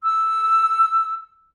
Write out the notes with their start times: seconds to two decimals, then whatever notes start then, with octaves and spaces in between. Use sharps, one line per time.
0.04 E6